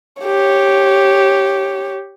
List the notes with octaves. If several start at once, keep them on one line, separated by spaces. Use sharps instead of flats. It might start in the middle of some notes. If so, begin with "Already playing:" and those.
G4 C#5